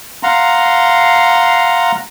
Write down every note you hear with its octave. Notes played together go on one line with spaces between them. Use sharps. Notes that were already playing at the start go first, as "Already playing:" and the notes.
F5 F#5 A#5 C6